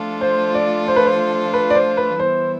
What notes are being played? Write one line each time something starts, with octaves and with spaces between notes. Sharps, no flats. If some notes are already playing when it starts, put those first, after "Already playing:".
Already playing: F3 A3 D4 F4 A4
C5
D5
C5
B4
C5
B4
D5
C5
B4
E3 G3 B3 E4 C5